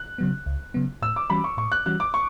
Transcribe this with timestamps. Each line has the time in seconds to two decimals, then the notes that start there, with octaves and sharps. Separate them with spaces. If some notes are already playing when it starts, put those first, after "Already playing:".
Already playing: F#6
0.18 C#3 F#3 B3
0.46 C#2
0.74 C#3 F#3 B3
1.02 A2 E6
1.16 D6
1.30 E3 G3 C#4 F#4 B5
1.44 C#6
1.57 A2 C#6
1.72 F#6
1.86 E3 G3 C#4 F#4 F#6
2.00 D6
2.14 C#6